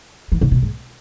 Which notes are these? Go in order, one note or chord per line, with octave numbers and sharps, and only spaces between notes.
E3
C#3
B2
G#2